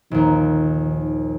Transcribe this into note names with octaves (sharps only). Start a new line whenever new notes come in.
A#1 D#2 D#3